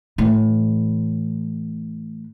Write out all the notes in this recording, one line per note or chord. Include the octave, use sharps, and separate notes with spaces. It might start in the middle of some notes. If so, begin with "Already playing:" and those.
A2 E3